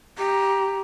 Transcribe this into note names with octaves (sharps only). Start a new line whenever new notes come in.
G4 A#5